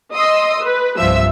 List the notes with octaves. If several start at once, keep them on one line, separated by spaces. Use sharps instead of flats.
D#5 C6 D#6 E6
B4
C2 G2 F3 E5 E6